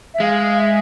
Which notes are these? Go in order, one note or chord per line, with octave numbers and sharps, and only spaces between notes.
E5
G#3 F5
E5